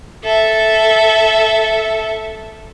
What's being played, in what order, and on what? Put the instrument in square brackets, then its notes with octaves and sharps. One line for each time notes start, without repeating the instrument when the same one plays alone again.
[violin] A4 E5